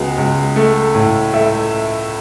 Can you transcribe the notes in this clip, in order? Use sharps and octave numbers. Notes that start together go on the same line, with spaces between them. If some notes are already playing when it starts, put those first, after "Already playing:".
Already playing: C#2 G#3 B3 F#4 G#4 G#5
C#2
A3
A2
A3 E5